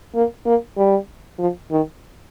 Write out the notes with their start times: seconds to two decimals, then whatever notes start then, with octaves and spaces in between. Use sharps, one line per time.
0.15 A#3
0.46 A#3
0.77 G3
1.39 F3
1.71 D#3